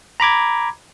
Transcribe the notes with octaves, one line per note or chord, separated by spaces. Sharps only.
A#5 B5 D6 G#6